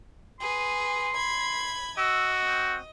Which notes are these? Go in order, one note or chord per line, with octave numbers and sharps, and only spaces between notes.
G#4 B4 C6
B5 G#6
F#4 D#5 E6
C4